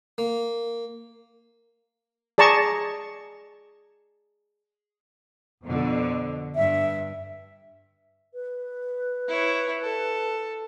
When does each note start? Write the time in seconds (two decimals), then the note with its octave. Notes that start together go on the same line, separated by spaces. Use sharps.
0.18 A#3
2.38 G#4 D5 A5 A#5 C#6
5.62 F2 B2 D3
6.56 G2 E5
8.34 B4
9.28 E4 C#5
9.81 A4